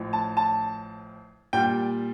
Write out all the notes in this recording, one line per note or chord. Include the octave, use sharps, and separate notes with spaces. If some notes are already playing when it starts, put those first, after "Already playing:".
Already playing: A1 A2 F3
A5
A5
A#2 G3 G5